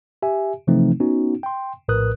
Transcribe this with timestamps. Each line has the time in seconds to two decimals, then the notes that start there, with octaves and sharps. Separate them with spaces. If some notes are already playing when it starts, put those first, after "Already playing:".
0.22 G4 E5 G#5
0.67 C3 E3 F3 A3 C4 D#4
1.00 B3 C#4 D#4 F#4
1.43 G5 C6
1.88 A#1 A2 A#4 B4 D#6 F#6